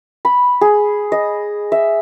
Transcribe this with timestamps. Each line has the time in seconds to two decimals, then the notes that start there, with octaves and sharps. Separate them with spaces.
0.25 B5
0.61 G#4
1.12 D#5
1.72 E5